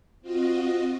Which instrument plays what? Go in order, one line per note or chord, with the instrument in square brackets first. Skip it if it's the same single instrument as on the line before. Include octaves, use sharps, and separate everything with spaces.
[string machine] C4 F4 F#4 D#5